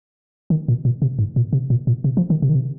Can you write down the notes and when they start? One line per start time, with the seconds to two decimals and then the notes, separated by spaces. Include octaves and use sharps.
0.50 D#3
0.68 A#2
0.85 A#2
1.02 C3
1.19 G#2
1.36 A#2
1.53 C3
1.70 A#2
1.87 A#2
2.04 C3
2.17 F3
2.30 D#3
2.42 C3
2.49 D#3
2.55 C3